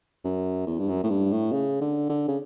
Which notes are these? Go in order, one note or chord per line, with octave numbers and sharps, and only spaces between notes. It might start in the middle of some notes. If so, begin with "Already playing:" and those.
F#2
E2
G2
F#2
A2
G2
A2
C#3
D3
D3
C#3